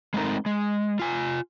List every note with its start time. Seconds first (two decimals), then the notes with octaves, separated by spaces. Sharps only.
0.14 G#3 A3 C4 D#4 A#4
0.46 G#3
0.99 F4 G#5